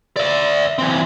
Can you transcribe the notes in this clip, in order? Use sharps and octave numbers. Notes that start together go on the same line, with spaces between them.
D5 E5
E3 C4